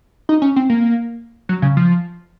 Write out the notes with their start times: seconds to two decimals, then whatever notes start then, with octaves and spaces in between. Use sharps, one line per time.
0.29 D#4
0.42 C#4
0.56 C4
0.70 A#3
1.49 F#3
1.62 C#3
1.77 F3